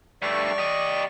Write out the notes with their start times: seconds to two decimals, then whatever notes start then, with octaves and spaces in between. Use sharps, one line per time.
0.22 G2 A3 D5 C#6
0.58 G4 D#5